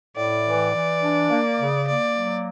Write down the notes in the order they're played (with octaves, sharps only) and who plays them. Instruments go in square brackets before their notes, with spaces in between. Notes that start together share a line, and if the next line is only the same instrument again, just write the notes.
[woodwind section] A2 [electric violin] D5
[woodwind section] E3
E3
D4
A#3
C#3
[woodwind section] A#3 [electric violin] D5
[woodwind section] F#3